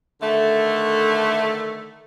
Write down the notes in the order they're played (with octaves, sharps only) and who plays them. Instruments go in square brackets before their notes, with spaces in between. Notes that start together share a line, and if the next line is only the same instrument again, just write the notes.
[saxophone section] D3 D#3 A3